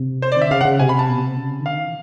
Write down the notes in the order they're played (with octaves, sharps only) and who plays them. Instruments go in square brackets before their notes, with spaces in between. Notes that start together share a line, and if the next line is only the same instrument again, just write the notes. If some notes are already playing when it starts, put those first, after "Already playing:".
Already playing: [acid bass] C3
[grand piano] C5
D5
[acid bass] D#3
[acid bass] D3 [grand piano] E5
[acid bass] C#3 [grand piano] F5
[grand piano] F#5
[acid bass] C#3
[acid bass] C3 [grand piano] G#5
[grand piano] B5
A5
[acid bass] B2
C3
C#3
D#3
[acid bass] D3 [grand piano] F5
[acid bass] D#3
E3